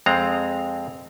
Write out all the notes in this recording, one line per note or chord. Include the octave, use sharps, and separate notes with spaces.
F2 G#3 C4 A#5